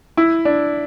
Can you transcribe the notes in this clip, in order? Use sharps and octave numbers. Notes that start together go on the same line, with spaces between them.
E4
D4